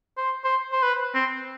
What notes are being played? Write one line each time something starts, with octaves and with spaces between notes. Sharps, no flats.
C5
C5
C5
B4
C4